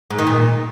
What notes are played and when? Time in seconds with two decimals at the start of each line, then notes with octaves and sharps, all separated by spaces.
0.10 G#2
0.19 D#3
0.27 A#2